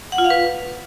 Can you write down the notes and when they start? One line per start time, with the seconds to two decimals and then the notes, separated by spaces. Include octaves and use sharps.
0.12 F#5
0.18 F4
0.24 F5
0.30 B4